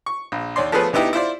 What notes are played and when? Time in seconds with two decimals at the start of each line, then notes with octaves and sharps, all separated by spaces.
0.06 C#6
0.32 A#1
0.56 D#2 C#5 D5 C6
0.72 F3 A3 B3 G#4 B4 C#5
0.93 D2 B3 D#4 E4 G4
1.13 E4 F4 C5 D5